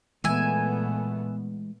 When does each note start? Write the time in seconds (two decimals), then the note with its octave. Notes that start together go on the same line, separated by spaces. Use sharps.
0.24 A#2 E3 G#3 A3 B3 E5 G#5